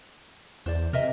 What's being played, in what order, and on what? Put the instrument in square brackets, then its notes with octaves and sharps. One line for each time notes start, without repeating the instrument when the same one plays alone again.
[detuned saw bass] E2 [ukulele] C5 D5
[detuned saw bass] C3 [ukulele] A#4 D#5 E5